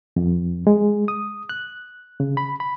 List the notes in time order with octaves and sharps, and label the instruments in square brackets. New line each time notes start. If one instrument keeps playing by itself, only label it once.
[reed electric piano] F2
G#3
D#6
F#6
C#3
B5
B5